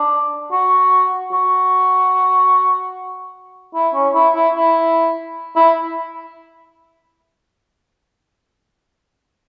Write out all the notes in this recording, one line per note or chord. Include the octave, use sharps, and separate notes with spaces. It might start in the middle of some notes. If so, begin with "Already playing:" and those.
Already playing: D4
F#4
F#4
E4
C#4
E4
E4
E4
E4